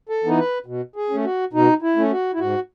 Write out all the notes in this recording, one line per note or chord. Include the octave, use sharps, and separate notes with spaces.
A4
E3 B3 D#4
B4
B2
G#4
A3 C#4
F#4
B2 D#4
E4
A3 C#4
F#4
E4
G#2 F#4